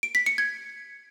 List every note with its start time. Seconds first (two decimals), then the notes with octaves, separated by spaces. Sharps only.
0.03 D7
0.15 B6
0.26 C#7
0.38 G#6